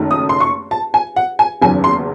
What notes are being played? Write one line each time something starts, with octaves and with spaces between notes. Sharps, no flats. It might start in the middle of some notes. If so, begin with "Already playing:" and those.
Already playing: F#1 F#2 D#3 A3 D#4
D#6
C6
C#6
A5
G#5
F#5
G#5
F#1 E2 D#3 F#3 C#4 G#5
C6